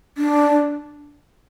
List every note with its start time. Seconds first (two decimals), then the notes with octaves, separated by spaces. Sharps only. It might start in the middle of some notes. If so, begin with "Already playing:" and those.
0.18 D4